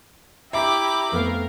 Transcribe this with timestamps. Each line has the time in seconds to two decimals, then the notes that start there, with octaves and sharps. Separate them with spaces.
0.53 E4 G4 E5 A#5 B5 D6
1.12 F2 A3 B3 A#4 F5